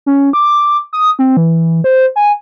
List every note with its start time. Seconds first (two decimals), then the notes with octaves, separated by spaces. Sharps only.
0.06 C#4
0.33 D6
0.93 D#6
1.19 C4
1.37 E3
1.84 C5
2.16 G#5